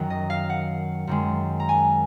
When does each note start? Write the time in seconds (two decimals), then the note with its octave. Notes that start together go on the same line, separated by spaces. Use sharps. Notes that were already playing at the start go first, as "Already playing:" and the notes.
Already playing: F#2 D#3 F#3
0.10 D#5
0.30 F5
0.50 F#5
1.07 F#2 D#3 G#3
1.60 A#5
1.69 G#5